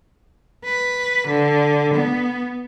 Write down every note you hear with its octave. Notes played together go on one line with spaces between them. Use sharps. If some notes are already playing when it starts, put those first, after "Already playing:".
B4
D3
B3